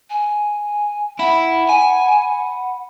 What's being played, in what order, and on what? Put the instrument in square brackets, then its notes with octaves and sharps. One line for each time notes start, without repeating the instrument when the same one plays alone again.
[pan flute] G#5
[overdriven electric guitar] E4 [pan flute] F#5 [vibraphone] B5
[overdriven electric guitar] G#5